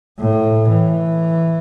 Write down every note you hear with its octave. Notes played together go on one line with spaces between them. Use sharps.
A2
E3